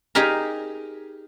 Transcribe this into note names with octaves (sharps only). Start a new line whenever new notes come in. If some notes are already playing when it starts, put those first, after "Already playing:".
D#4 G4 G#4 A#4 A#5